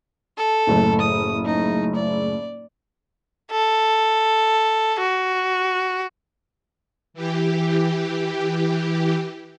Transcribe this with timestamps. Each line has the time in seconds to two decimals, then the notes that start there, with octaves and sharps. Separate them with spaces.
0.38 A4
0.67 F#1 A2
1.00 D#6
1.45 D#4
1.95 D5
3.51 A4
5.00 F#4
7.14 E3 G4